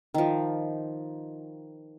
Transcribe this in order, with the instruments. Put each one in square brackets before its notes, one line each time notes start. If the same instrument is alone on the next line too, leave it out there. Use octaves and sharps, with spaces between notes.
[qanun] D#3 F3